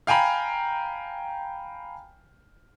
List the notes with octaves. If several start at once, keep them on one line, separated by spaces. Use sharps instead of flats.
F5 G5 G#5 A#5 B5